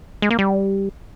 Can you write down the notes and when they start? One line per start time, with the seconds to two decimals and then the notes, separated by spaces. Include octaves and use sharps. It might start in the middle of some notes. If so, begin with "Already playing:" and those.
0.22 G#3
0.30 A#3
0.39 G3